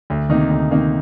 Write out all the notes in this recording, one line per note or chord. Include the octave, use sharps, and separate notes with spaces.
D2
C3 D#3 A#3 D#4
D2
C3 D#3 A#3 D#4